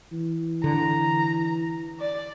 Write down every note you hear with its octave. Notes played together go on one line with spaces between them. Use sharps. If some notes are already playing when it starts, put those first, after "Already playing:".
E3
D3 A#5
D5